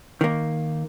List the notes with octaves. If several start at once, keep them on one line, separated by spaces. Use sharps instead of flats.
D#3 A#3